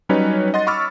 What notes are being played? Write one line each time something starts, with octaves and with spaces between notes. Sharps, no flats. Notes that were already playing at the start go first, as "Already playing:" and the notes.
F#3 G3 C#4 D#4 B4 C#5
D#5 F#5 C6 A6
B5 C#6 D6 E6 F6 A6